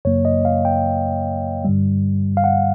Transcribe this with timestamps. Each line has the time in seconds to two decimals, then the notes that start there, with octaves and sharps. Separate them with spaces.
0.05 F#2 C#3 F#3 A#3 C#5
0.25 D#5
0.45 F5
0.65 G5
1.65 G2 D3 G3
2.37 F5
2.44 F#5